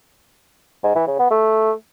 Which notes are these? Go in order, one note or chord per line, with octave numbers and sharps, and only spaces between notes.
G#2
E3
C#3
B3
A3